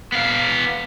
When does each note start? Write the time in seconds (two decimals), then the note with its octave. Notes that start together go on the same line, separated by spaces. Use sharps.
0.12 B3 F5